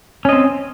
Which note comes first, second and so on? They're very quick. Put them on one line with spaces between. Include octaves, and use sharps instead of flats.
C#4 D#5 C4